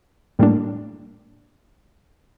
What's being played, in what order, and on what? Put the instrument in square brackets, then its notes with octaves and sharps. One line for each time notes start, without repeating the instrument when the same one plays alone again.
[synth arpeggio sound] A2 G3 A#3 D4